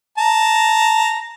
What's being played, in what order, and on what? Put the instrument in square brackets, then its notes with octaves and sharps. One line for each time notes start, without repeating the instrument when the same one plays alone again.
[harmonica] A5 A#5